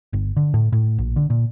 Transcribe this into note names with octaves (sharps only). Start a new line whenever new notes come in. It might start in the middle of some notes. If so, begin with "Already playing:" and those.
G1
D3
A2
A2
A#1
D3
A#2